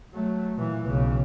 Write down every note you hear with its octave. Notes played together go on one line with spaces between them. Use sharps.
F#3 A3
A#2 E3
B1 C#3